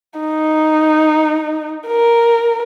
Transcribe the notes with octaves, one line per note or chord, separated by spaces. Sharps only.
D#4
A#4